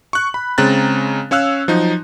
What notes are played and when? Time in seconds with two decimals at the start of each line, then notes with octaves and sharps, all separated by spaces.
0.13 C#6 F#6
0.34 B5
0.58 C#3 G#3 C4 A#5 F#6 A6
1.31 C#4 C#5 F5 E6 F#6
1.68 F3 F#3 D#4